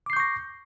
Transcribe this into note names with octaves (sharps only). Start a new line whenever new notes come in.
C#6 D6 G6 A#6 C7